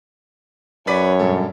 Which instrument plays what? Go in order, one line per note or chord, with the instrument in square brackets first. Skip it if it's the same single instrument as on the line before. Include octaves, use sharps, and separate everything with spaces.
[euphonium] F#2 [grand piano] B4 D5 B6 [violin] C#5
[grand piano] E1 G2 A4